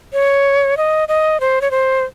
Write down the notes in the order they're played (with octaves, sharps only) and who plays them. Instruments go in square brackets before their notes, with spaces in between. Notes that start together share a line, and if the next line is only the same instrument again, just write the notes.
[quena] C#5
D#5
D#5
C5
C#5
C5